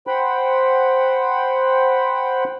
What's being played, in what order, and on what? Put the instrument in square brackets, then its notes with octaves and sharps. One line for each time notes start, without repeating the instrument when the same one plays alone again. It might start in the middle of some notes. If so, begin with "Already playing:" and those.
[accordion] C5 F#5 G5 B5